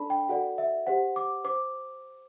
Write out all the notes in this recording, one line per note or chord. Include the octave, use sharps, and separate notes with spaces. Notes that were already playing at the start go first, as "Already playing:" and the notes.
Already playing: D4 A4 D5 A5 B5
G5
F#4 A4 D5 F#5
E5
G4 C5 F#5
D6
C5 D6